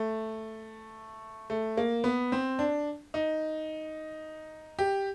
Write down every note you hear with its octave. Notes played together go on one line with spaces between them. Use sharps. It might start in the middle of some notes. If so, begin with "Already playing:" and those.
Already playing: A3
A3
A#3
B3
C4
D4
D#4
G4